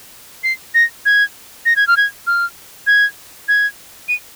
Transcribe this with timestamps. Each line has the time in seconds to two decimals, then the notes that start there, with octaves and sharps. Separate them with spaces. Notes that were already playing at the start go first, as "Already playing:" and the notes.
0.44 C7
0.74 A#6
1.06 G#6
1.65 A#6
1.76 G#6
1.88 F6
1.97 G#6
2.27 F6
2.87 G#6
3.48 G#6
4.08 D#7